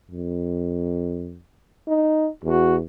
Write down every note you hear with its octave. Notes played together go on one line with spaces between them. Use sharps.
F2
D#4
E2 F#4